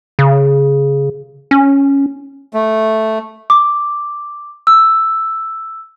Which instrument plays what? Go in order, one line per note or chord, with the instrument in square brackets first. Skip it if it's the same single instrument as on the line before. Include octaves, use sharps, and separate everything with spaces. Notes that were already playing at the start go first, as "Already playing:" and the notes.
[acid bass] C#3
C#4
[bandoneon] A3
[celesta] D6
E6